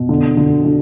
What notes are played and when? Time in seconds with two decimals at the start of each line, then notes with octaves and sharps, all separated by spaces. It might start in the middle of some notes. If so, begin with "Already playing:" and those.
Already playing: B2
0.09 D3
0.37 D3
0.65 D3